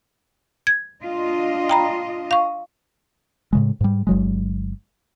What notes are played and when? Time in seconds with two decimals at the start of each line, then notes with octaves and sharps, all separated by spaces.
0.67 G#6
1.04 D4 F4 D#5
1.69 G5 A#5 B5
2.31 F5 C#6
3.53 A2 C#3 G#3
3.81 G#2 G3
4.07 G1 F#3 G#3